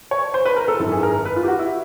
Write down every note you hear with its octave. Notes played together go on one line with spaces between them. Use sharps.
C#5
C5
B4
A#4
A4
G#1 F#2 D#3 A4
G#4
A#4
B4
F4
G4
F#4
E4